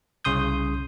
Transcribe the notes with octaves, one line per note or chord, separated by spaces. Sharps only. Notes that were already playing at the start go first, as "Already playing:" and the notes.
C2 C#3 C6 D#6 G6